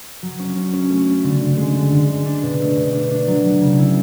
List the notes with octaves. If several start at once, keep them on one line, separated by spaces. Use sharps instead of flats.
F#3
C#4
C#4
C#4
A3
C#4
D3
D3
G#3
D3
D3
G#3
D4
B2
A3
B2
D4
D4
F#3
F#3
C#3
E4